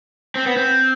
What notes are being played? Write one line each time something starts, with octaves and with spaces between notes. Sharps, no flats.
C4
B3
C4